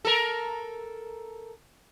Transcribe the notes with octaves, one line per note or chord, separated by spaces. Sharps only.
A4 A#4